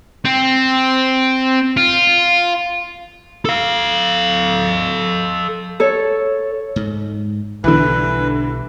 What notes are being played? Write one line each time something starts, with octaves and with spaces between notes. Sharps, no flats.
C4
F4
A4 F5
A4 C#5
G#2
B1 D3 E3 G3 B4